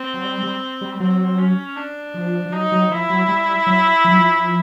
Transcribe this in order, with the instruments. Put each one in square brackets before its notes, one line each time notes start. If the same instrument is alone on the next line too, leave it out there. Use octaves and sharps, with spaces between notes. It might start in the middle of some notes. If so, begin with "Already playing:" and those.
Already playing: [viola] C4
[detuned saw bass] F#3
G3
G3
G3
[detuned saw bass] F#3 [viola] C4
[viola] C#4
D4
[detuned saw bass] F3
F3
[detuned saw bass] F#3 [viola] D#4
[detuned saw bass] F#3
[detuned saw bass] F3 [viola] E4
[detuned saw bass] F#3
G3
F#3
F3
F#3
F3